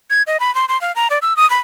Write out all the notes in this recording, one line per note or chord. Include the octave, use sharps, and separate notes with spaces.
G#6
D#5
B5
C6
C6
F5
A#5
D5
E6
D#6
B5